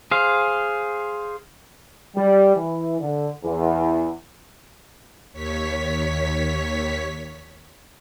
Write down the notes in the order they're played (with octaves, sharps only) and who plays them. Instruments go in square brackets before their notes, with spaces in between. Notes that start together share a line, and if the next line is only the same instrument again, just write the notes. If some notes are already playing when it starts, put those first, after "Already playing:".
[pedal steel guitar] G#4 C5 F5
[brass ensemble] G3
E3
D3
E2
[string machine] D#2 C#5 B6